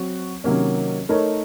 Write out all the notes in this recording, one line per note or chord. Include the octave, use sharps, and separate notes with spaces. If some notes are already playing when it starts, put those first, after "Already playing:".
Already playing: F#3 C4 F#4
C3 D#3 F#3 A#3 C#4
A3 D#4 A#4 C#5